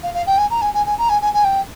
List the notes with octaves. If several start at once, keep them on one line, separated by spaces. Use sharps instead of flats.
F5
F5
G5
G#5
A#5
G#5
G#5
G#5
A#5
G#5
G#5
G#5
G5